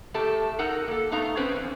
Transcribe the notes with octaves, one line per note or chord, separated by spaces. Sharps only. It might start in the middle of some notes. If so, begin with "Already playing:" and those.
A2 A3 G4 A4 A5
D#4 A4 A#4 F#5
A#3 A4
A3 B3 D#4 F5 A#5
C4 C#4 B4 C5
E2